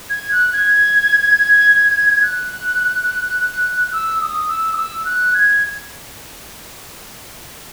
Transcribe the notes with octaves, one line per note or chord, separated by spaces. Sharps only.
G#6
F#6
G#6
F#6
F#6
E6
D#6
E6
D#6
E6
F#6
G#6